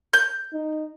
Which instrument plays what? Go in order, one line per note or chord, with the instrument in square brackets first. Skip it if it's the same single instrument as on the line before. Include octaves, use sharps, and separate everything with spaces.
[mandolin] G6
[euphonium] D#4